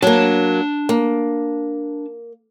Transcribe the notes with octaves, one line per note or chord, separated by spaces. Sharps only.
F#3 A#3 D4 A5
A#3